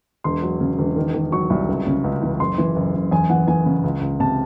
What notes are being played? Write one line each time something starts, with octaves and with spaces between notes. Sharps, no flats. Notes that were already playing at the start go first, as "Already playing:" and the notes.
E1 C6
F#3
C#3
E1
D#3
D#3
F#3 C#6
C2
C#2
C#3
C#2
E3
F#1 C6
E3
F#1
F#1
E2 G#5
E3 F#5
E3 G#5
C#3
C#2
C#2
C3 A5